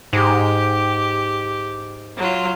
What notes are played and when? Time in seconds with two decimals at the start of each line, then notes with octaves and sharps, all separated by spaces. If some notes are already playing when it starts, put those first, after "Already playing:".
0.13 G#2 G4
2.17 F#3 F4